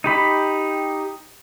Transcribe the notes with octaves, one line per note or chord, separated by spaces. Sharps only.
D#4 G4 B5